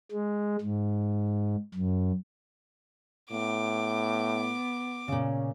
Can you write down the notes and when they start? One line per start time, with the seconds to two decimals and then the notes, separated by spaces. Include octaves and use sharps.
0.12 G#3
0.61 G#2
1.74 F#2
3.31 A2 B3 D6
5.08 A#2 C#3 C#4